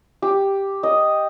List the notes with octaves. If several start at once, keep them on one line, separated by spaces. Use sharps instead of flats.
G4
D#5